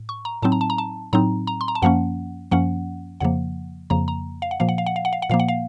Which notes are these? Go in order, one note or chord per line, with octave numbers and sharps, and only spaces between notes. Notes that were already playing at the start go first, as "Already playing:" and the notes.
Already playing: A2
C#6
A#5
A2 F#3 C4 D#4 A5
A#5
A5
A#5
A5
A2 F#3 C4 D#4 A#5
A#5
C6
A#5
A5
F#2 F3 A#3 C#4 F#5
F#2 F3 A#3 C#4 F#5
F2 C#3 F3 A#3 F#5
F2 C#3 F3 A#3 A#5
A#5
F5
F#5
A#2 F3 A#3 F5
F#5
F5
F#5
F5
F#5
F5
F#5
A#2 F3 A#3 F5
F#5
F5